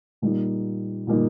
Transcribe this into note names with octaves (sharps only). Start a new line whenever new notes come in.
A#2 G3 A#3 D#4
A#2 G3 A#3 D#4